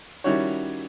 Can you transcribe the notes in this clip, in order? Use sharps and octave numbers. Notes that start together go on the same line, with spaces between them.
D#3 G3 C#4 E4 F#4 C#5